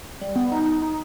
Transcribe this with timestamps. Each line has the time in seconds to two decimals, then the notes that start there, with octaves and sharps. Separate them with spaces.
0.21 G3
0.36 B3
0.52 D#4
0.66 D#4
0.82 D#4